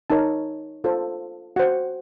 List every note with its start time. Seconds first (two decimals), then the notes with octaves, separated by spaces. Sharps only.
0.10 D#4 A#4 C#5 A5
0.84 F4 A4 C5
1.56 F#4 C5 F#5